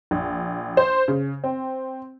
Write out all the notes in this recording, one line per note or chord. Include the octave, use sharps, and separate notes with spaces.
A#1
C5
C#3
C4